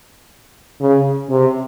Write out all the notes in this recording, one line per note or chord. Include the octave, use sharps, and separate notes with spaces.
C#3
C3